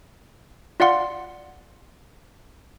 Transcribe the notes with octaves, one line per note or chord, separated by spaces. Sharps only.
F4 D5 F5 F#5 C6